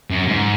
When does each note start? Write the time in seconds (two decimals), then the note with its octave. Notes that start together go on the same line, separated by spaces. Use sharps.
0.10 F#2
0.28 G#2